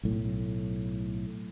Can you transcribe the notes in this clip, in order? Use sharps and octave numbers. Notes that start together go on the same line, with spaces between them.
B1 A2